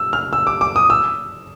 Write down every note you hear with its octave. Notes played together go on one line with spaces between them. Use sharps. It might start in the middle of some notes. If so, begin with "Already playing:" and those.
Already playing: E6
F6
E6
D6
D6
D#6
E6